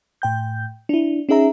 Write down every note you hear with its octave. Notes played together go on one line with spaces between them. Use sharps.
A2 G5 G6
D4 E4
C#4 D#4 G#4 E5 A#5